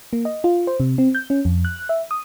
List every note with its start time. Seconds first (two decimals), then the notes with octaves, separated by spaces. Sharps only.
0.13 A#3
0.25 D#5
0.44 F4
0.67 C5
0.80 C3
0.98 C4
1.15 G6
1.30 C#4
1.45 F2
1.65 F#6
1.89 E5
2.11 D#6